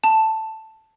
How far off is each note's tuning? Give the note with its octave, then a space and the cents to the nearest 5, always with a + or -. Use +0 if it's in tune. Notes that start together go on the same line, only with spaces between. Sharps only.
A5 +5